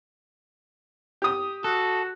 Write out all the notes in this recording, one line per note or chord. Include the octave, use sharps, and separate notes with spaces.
G4 D#6
F#4 A4